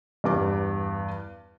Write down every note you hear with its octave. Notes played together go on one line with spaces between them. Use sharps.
E2 G2 D6